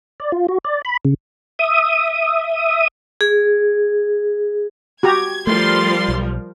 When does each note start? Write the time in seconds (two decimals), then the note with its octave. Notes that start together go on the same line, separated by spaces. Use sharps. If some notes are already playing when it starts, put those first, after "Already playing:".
0.20 D5
0.32 F4
0.48 F#4
0.65 D5
0.85 B5
1.05 C#3
1.59 E5 D#6
3.21 G#4
5.03 F#4 G4 A#5 G#6
5.47 F3 G3 A3 A#4 C6 A6 C7
6.08 B1